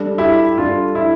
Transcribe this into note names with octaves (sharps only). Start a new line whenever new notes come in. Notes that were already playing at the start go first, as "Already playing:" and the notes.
Already playing: G3 D4 A4
E4 G4
G3 D4 F4 A4
E4